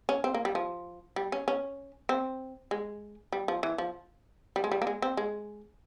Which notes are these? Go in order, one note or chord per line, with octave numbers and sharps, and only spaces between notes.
C#4
C4
A#3
G3
F3
G3
C#4
C#4
C4
G#3
G3
F3
E3
F3
G3
G#3
G3
A#3
G#3
C4
G#3